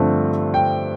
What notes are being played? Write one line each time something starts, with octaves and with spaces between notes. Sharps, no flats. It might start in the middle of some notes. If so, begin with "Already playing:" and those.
Already playing: G2 D3 F3 A3 C4
G5